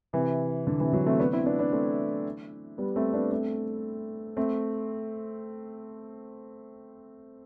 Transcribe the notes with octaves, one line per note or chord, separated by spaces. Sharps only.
C3 E3
D3
C3 E3
D3 F#3
A3 C4
B3 D4
C4 E4
B3 D4
B3 D4
A3 C4
G3 B3
A3 C4
B3 D4
A3 C4
A3 C4